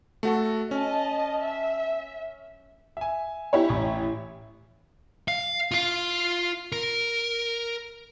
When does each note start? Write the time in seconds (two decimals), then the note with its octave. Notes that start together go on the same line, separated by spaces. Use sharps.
0.23 A3 F#4 A4
0.71 C#4 D#5 A5
1.42 E5
2.97 E5 G#5
3.53 E4 G4 C#5
3.69 A1 C#6
5.28 F5
5.72 F4 F5
6.72 A#4